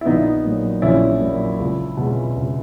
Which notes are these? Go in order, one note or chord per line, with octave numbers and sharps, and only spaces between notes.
E4
A#1 B3 D#4
A#2 F#3
A#1 C#4 E4
A#2 F#3
C#2
B2 G#3
C#2